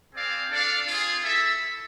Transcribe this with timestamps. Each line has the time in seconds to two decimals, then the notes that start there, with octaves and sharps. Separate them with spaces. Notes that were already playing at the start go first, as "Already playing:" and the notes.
0.14 C4 G#4 D5 F5
0.51 D4 A4 D5 F5
0.87 C4 F4 G#4
1.23 E4 A4 E5